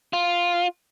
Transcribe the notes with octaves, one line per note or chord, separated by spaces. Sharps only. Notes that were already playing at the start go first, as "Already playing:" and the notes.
F4